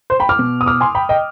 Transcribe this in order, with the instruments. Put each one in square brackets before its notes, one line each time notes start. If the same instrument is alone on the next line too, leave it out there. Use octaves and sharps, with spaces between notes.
[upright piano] C5
G5 B5
D6 F6
B2
D#6
D6 F6
G#5 C6
G5 B5
D#5 G5